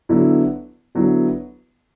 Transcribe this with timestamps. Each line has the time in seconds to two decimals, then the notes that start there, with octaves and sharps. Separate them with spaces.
0.09 D3 F#3 B3 E4
0.95 D3 F#3 B3 E4